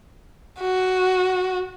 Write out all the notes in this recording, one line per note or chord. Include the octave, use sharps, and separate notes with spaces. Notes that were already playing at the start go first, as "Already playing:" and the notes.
F#4